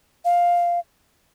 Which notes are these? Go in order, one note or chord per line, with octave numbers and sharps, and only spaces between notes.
F5